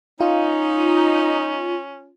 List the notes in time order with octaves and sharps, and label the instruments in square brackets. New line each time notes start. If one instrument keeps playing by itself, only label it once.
[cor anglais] C#4 [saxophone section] D#4 [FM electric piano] F4